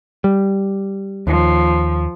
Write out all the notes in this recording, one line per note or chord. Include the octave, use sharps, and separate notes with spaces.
G3
D#2 F3